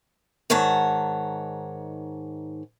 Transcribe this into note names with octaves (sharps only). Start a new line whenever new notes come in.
G#2 D#3 C#5 F#5 A5